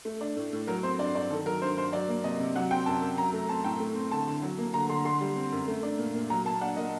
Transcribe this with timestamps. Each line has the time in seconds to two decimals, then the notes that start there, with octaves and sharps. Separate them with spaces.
0.05 A3
0.21 D4
0.36 A2
0.53 A2
0.67 F#3 A#4
0.83 C4 C5
0.99 G2 D5
1.14 G2 D5
1.30 D#3 A4
1.46 F#3 A#4
1.62 G2 C5
1.77 G2 C5
1.92 F#3 D5
2.09 A#3
2.24 C3 D#5
2.40 C3
2.55 F#3 F#5
2.71 C4 G5
2.86 F#2 A5
3.02 F#2
3.18 F#3 A#5
3.33 A3
3.49 C4 A5
3.64 A2 G5
3.80 A3
3.95 C4
4.11 D3 A5
4.27 D3
4.42 F#3
4.58 A#3
4.74 D3 A#5
4.89 D3 C6
5.05 D3 C6
5.21 G3
5.36 C4
5.52 F#2
5.68 A3
5.83 D4
5.99 A#2
6.14 A#2
6.30 F#3 A#5
6.45 A#3 A5
6.61 D4 F#5
6.77 A#2 D#5